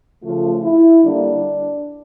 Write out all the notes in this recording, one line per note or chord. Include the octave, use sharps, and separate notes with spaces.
C#3 F3 A3 F4
E4
D3 G3 A#3 D4